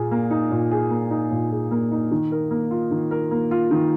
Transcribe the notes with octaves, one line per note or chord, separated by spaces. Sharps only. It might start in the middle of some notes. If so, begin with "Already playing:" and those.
Already playing: A#2 G#4
A#3
D#4
A#2
G#4
A#3
D#4
A#2
G#4
A#3
D#4
D#3
A#4
A#3
F4
D#3
A#4
A#3
F4
D#3